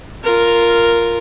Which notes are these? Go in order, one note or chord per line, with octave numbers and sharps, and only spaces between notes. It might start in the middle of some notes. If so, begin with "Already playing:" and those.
F4 A#4